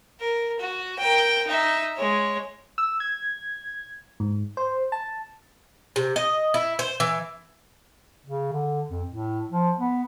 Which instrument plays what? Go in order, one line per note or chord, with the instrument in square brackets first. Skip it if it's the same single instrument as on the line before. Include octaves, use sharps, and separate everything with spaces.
[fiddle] A#4
F#4
A#4 G5
D#4 E5
G#3 C#5
[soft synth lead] E6
G#6
G#2
C5
A5
[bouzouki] C3
D#5
E4
C5
E3
[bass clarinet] C#3
D3
F2
A2
F3
B3